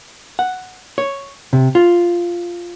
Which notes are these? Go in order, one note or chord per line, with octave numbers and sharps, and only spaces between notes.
F#5
C#5
C3
F4